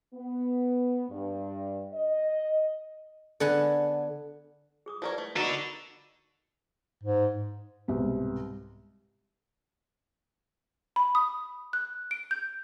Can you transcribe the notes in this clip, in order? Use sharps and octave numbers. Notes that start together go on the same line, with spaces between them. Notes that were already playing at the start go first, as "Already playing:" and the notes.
B3
G2
D#5
D3 B3 F#5 G#5
G#4 D6 D#6
F3 E4 A#4 B4 C#5 D5
A3
A#3 B3 D4 D#4 F#4 A4 B5 C#6
G#2
C2 G#2 B2
B5
D#6
F#6
D7
G6